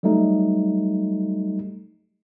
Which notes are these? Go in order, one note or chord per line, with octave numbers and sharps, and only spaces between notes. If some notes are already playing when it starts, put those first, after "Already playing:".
F#3 G3 A3 D#4